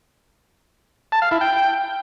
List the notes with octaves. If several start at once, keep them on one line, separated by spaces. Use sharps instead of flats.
A5
F5
E4
G5